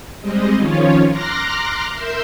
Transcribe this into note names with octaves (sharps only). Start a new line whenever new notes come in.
G3 G#3 C4 D#5
D#3 F3 C#4 F4 C#5
A#5 C6 D6 F6 F#6 A#6
A#4 E5 C6 E6 G6